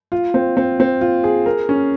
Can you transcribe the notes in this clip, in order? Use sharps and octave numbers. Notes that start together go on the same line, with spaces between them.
F4
C4
C4
C4
F4
G#4
A#4
C#4